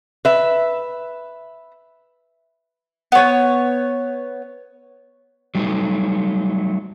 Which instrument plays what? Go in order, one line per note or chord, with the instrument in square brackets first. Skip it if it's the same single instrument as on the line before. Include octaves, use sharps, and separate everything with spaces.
[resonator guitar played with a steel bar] B4 E5
[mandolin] B3 C#5
[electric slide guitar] F#3 G3 A3 D#4